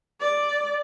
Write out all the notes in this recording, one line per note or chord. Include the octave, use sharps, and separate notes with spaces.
D5